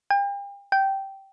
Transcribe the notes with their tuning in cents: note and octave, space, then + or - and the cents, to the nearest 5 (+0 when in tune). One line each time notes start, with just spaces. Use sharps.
G5 +40
G5 -10